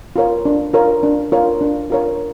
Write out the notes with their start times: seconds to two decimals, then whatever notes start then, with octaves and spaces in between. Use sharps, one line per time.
0.16 F4 A#4 C#5
0.45 D4
0.73 F4 A#4 C#5
1.03 D4
1.32 F4 A#4 C#5
1.61 D4
1.90 F4 A#4 C#5